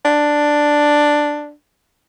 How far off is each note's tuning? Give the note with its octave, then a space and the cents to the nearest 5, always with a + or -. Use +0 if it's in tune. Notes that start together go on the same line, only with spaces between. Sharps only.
D4 +5